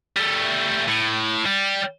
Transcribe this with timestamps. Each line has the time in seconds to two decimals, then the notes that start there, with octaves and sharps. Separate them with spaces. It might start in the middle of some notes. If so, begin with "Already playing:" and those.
0.17 G3 A3
0.88 A2
1.46 G3